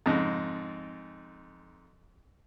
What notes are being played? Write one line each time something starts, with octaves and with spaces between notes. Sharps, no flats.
F2 G#2 C#3